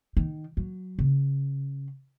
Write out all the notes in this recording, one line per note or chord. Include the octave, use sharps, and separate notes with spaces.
D#3
F#3
C#3